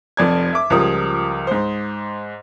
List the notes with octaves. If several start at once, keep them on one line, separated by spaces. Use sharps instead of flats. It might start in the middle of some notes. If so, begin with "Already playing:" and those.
F1 F2 D5 G#6
E5 D6
C#2 F3 G3 A#4 D#6
G#2 C5